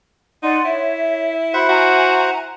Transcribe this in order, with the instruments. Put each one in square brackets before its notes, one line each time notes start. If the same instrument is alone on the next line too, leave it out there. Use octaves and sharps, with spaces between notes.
[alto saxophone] D#4 [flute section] D5 F#5 C6
[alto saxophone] E4 [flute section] C#5 E5
[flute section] F#4 B5 [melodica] C5 F#5 [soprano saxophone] E5
[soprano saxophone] F#4 [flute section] G#5 A#5